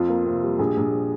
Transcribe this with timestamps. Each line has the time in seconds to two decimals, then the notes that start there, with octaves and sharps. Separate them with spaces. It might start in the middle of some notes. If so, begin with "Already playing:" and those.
Already playing: F2 F4
0.09 A#3
0.26 C3
0.43 G3
0.59 A#1 G#4
0.77 A#1